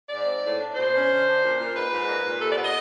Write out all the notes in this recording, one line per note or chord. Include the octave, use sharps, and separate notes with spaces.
G#2 D5
C4
A2
D4
B2 C5
C#4
D3
D4
A#2
A#2
G#2 B4
G#2
A#2
A#2
C3 A4
D5
B3
D#5